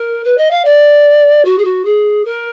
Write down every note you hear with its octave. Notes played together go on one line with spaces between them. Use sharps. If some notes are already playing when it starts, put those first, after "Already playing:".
Already playing: A#4
B4
D#5
F5
D5
F#4
G#4
F#4
G#4
A#4